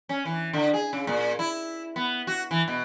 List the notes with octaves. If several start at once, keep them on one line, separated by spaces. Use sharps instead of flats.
C#4
E3
D3
G#4
C#3
A#2
E4
B3
F#4
E3
B2